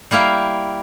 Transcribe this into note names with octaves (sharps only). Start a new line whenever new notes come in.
G3 A#3 E4 F5 G5